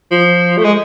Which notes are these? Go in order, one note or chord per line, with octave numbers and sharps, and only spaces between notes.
F3
A3
G#3